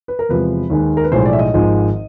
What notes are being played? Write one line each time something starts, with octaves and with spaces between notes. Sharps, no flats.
B4
A#4
E2 C3 F3 G#3 B4
D#2 D#3 G#3
A#4
B4
B1 A2 F3 G#3 C5
D5
E5
D#5
G#1 G#2 F3 G#3